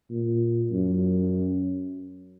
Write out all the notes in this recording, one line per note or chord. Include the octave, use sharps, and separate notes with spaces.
A#2
F#2